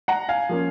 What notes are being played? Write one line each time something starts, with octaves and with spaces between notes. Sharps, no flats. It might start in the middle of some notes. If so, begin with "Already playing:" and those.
F#5 A#5
F5 G#5
F3 A#3 C#4